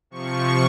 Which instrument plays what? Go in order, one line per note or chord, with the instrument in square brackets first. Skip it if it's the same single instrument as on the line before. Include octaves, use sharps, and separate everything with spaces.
[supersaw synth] C3 F3 C#6